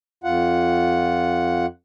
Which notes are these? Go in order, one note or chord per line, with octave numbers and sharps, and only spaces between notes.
F2 F4 F#5